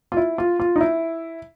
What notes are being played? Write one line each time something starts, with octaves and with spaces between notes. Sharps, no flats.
F4
E4
F4
F4
D#4
E4